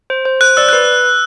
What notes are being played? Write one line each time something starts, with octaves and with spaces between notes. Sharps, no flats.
C5
C5
C5 F#6
D5 E6
F#6
B4